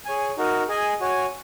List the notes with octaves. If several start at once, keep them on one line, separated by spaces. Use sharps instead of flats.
G#4 C#5 G#5
D#4 F#4 A#4
G#4 D#5 G#5
F#4 C#5 G#5